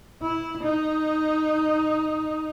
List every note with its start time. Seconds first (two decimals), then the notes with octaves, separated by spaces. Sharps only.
0.22 E4
0.63 D#4